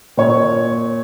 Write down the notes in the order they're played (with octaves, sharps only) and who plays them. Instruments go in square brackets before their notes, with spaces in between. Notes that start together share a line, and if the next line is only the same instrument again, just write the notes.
[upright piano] A#2 C#5